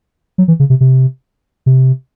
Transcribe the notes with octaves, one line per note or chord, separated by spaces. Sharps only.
F#3
E3
C#3
C3
C3
C3